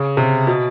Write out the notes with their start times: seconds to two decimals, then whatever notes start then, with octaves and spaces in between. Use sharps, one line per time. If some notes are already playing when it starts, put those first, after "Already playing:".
Already playing: C#3
0.17 C3
0.47 B2